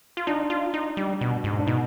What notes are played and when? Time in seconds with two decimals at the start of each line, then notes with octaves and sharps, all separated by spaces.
0.17 F4
0.27 D4 D#4
0.50 F4
0.74 D#4
0.97 G3
1.21 B2
1.44 G#2
1.59 D4
1.67 B2 D#4